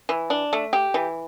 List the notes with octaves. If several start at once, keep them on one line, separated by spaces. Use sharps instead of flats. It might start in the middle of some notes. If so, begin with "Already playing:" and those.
E3
D4
A3
G4
E3